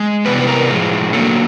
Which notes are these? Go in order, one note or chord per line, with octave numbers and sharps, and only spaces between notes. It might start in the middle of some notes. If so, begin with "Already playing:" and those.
Already playing: G#3
C3 E3 G3 B3 B4
B4
A#4
A2 F3 G#3
D3 F#3 A#3 A4